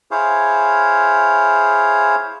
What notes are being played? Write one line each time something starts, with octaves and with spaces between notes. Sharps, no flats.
E4 G#4 C5 C#5 F5